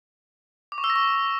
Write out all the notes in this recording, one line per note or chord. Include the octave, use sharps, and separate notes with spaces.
D6
C#6
E6
A#6
C#6